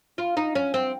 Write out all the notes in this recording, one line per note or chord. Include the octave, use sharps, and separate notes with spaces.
F4
D#4
C#4
C4